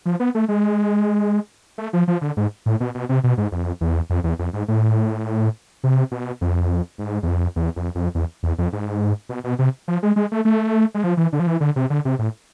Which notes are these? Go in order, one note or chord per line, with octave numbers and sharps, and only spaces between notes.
F3
B3
A3
G#3
A3
F3
F3
D3
G#2
A2
B2
B2
C3
B2
G#2
F2
E2
F2
E2
F2
G#2
A2
C3
B2
F2
G#2
E2
F2
E2
F2
F2
E2
E2
F2
G#2
B2
B2
C3
F3
G#3
G#3
A3
A3
G#3
F3
E3
D3
F3
E3
D3
C3
D3
C3
A2